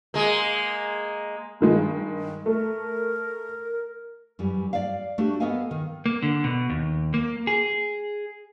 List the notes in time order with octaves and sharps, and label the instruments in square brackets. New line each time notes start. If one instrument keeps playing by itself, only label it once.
[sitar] G#3 A#3
[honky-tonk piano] G2 D#3 G#3
[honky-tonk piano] A3 [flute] A#4
[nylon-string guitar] F#2 E3 G3
D5 F5
A3 D4 F#4 G4
B3 A4 A#4 D#5 F5 G#5
D#3
[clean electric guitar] A#3
D3
B2
D#2
A#3
G#4